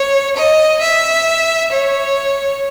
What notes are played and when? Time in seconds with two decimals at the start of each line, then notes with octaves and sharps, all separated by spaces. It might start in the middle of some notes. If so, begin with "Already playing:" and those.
Already playing: C#5
0.37 D#5
0.82 E5
1.72 C#5